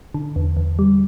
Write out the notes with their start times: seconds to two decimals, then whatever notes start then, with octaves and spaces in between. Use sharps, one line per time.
0.14 D3
0.36 E2
0.57 E2
0.79 G3